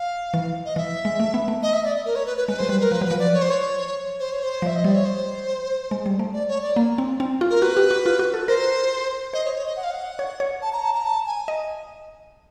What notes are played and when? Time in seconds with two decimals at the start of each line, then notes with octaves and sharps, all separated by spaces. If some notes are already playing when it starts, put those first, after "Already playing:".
Already playing: F5
0.34 E3
0.65 D#5
0.76 E3 E5
1.05 G#3
1.20 A3
1.34 B3
1.48 A3
1.63 D#5
1.73 E5
1.84 D5
2.06 A#4
2.16 C#5
2.26 B4
2.37 B4
2.48 G#3 B4
2.59 F#3 C5
2.69 G3 B4
2.81 A#4
2.91 F3 B4
3.01 F#3 B4
3.11 F3
3.19 D5
3.34 C#5
3.42 C5
3.50 C#5
4.20 C5
4.32 C#5
4.43 C5
4.62 F3 E5
4.76 D#5
4.84 G3 D5
4.95 C#5
5.05 C5
5.91 G#3
6.06 G3
6.19 A3
6.33 D5
6.48 C#5
6.62 D5
6.76 A#3
6.98 C4
7.20 C4
7.41 F4
7.50 A#4
7.62 F#4 B4
7.77 G4
7.91 F#4
8.06 F4
8.19 F#4
8.34 A4
8.48 A#4 C5
9.33 C5 D#5
9.45 C#5
9.55 C#5
9.65 D#5
9.76 F#5
9.84 F5
9.91 F#5
10.19 C#5
10.40 C#5
10.62 A5
10.73 A#5
10.83 A5
10.94 A#5
11.05 A5
11.26 G#5
11.48 D#5